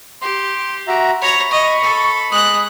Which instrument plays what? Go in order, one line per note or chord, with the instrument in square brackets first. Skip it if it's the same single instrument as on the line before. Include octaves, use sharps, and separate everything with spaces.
[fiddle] G4 [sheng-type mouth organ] C6
[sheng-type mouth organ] F#4 E5 A#5
[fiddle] C#5 A#5 [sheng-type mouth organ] B5
[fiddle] D#5 [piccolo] C#6
[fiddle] A4
[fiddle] G#3 F#6 [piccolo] D#6